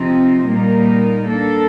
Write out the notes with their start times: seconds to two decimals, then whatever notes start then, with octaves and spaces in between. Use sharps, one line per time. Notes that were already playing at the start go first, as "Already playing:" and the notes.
Already playing: C3 F3 C4 D#4
0.47 A#2 G3 A#3 D#4 A#4
1.25 A#3 D4 A4